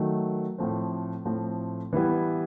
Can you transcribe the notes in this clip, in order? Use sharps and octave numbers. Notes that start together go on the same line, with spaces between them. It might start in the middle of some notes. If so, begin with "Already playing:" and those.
Already playing: D#3 F#3 A3
A2 F3 A3 C4
A2 F3 A3 C4
E3 G3 B3 E4